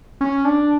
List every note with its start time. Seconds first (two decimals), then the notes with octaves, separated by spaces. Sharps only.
0.21 C#4
0.45 D4